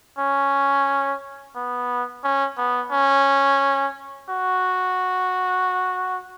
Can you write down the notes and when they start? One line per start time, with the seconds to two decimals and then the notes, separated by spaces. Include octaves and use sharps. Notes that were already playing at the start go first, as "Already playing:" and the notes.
0.19 C#4
1.56 B3
2.24 C#4
2.58 B3
2.92 C#4
4.30 F#4